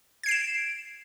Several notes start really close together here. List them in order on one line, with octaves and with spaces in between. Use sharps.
G#6 C7 D7 E7